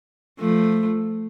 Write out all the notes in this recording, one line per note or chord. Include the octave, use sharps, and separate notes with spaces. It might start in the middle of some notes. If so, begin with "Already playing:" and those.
F3 A3